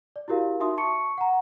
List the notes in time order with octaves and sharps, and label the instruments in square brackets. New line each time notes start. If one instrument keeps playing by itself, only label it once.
[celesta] D5
E4 F#4 G4 A#4 F5
D#4 F#4 E5 C6 D#6
A5 C#6 C#7
F#5 A#5